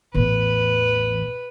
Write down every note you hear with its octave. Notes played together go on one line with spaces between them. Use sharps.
A1 E2 B4